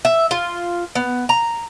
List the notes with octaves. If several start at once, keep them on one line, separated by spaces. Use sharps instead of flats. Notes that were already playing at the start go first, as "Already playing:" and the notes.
E5
F4
B3
A#5